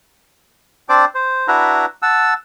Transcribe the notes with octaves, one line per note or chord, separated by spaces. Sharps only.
C4 D4 C5 D5 D6
C5
D4 E4 F#4 B4 E5 A#5
F#5 A5 E6